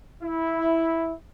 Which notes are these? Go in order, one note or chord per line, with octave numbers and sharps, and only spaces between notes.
E4